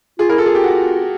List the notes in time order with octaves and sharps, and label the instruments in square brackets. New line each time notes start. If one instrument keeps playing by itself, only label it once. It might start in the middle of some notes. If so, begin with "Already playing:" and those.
[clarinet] F4 [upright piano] G#4
[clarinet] E4 [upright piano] A#4
[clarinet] F4 [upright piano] A4
[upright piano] G#4
G4
F#4